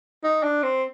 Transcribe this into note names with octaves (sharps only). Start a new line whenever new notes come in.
D#4
D4
C4